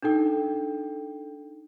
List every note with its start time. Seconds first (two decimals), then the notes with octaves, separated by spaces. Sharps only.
0.02 D4 D#4 A4 G5